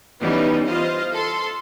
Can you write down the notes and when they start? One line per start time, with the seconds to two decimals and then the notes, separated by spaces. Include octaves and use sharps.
0.23 E3 G3 B3 C#4 D#4
0.67 F4 C5 D#5 F5
1.13 A4 C6